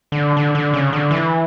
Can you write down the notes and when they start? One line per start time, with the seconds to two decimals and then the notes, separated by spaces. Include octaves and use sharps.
0.12 D3
0.37 D3
0.55 D3
0.74 C#3
0.93 D3
1.11 E3